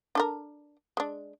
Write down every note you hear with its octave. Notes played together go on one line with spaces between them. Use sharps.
D4 A4 A#4
G#3 D4